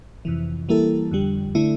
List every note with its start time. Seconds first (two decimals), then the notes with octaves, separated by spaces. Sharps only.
0.25 F2 C3 E3
0.69 E3 G3 A#3 E4 A4
1.11 F2 D3 G3
1.55 D3 A3 E4